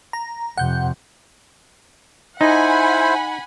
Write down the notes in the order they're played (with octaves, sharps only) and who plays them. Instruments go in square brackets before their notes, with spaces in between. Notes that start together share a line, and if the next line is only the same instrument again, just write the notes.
[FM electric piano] A#5
[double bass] F2 C3 [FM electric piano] F#5 G6
[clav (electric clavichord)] D#4 [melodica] E4 C5 [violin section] F#5 G#5 B5